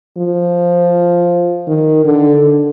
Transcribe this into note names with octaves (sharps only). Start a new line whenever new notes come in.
F3
D#3
D3